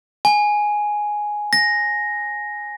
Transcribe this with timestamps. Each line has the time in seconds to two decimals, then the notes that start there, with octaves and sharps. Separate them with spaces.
0.25 G#5
1.53 A#6